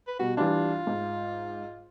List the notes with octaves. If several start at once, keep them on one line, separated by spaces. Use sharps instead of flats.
B4
B2 G3 F#4
E3 G3 D4 F4
G#2